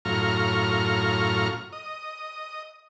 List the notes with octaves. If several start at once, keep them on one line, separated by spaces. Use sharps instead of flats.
F#2 A2 F4 A#5 C#6 F6
D#5